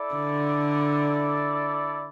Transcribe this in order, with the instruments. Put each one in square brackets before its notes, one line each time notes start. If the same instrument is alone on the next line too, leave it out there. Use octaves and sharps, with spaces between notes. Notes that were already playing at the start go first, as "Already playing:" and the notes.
Already playing: [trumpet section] E4 A4 D5
[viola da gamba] D3